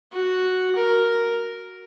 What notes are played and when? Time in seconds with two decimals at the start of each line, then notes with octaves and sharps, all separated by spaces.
0.12 F#4
0.76 A#4